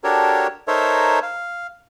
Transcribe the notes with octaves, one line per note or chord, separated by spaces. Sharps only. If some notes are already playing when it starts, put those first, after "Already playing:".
D4 F#4 G4 A4 A#4 C#5
D#4 A4 A#4 C5 C#5 E5
F5